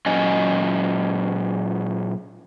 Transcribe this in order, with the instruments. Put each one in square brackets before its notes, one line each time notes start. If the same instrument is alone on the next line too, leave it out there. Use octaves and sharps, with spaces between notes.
[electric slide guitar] A#2 F#3 C#4 D#5 G#5